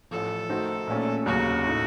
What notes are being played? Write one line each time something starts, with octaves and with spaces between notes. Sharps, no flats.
A1 A2 F3 A4
D#3 A3 D#4 F#4 C5
A#1 A#2 A3 C#4
F1 D#2 C#3 F#3 F#4
A2 A3 D#4